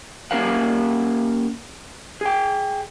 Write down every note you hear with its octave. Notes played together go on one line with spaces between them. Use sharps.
A#3 C#4 G4 A#4 F5 F#5
G#4 G5